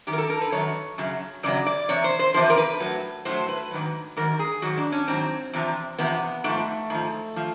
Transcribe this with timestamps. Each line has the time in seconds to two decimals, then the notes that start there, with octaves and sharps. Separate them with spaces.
0.07 F#2 D#3 F#3 G4
0.13 A#4
0.18 A4
0.30 A#4
0.41 B4
0.52 F#2 D#3 F#3 C#5
0.98 F#2 C#3 F#3
1.43 F#2 C#3 F#3 D5
1.67 D5
1.89 E2 C3 C#5
2.04 C5
2.19 C5
2.34 E2 C3 F3 C5
2.42 B4
2.50 A#4
2.58 B4
2.80 A2 F#3
3.25 A2 F#3 C5
3.49 B4
3.71 G#2 D#3 F#3
4.17 G#2 D#3 F#3 A#4
4.39 G#4
4.62 G#2 D#3 F#3 F#4
4.77 D4
4.92 C#4
5.08 G#2 D#3 F#3 C4
5.53 E2 C3 F3
5.99 E2 C3 F3 B3
6.44 G#2 F3 A3
6.90 G#2 F3
7.36 F3